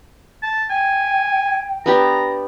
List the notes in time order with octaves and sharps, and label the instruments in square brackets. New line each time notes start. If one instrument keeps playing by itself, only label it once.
[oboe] A5
[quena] G5 [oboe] G#5
[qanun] B3 D4 G4 [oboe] A#5